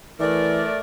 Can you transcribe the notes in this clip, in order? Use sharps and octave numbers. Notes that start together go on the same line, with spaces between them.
E3 A3 A#4 D5